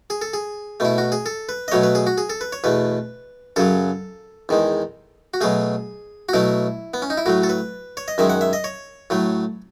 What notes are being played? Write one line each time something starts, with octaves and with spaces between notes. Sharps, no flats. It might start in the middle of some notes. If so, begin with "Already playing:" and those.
G#4
A4
G#4
B2 A3 E4
F#4
G#4
A4
B4
D#5
B2 F#3 A3 C#5
B4
G#4
F#4
G#4
A4
B4
C#5
E2 B2 A3 B4
F#2 C#3 F#3 A4
E2 D#3 G#3
F#4
B2 F#3 A3 G#4
F#4
B2 F#3 A3 E4
B3
C#4
D#4
E4
A2 F#3 A3 F#4
A4
B4
C#5
D#5
F#2 D#3 G#3 E5
F#5
E5
D#5
C#5
A2 F#3 A3